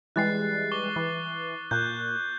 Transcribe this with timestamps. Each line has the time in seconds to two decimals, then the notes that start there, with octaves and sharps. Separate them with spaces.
0.16 E3 G3 G#3 F#6 A6 C7
0.72 C#6 D6 G7
0.96 E3
1.71 A#2 F#6 G6